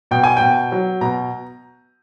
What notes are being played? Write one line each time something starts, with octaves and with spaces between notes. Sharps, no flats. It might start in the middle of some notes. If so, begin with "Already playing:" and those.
B2 G5
G#5
B2 G5
F#3
B2 A#5